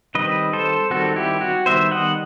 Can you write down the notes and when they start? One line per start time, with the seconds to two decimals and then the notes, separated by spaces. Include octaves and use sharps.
0.15 D#3 G3 C4 B4 D#5
0.53 A4 C5
0.90 D#3 G3 C4 F#4 A4
1.16 E4 G4
1.41 F#4
1.66 D#3 G3 B3 C5 E5
1.91 D#5 F#5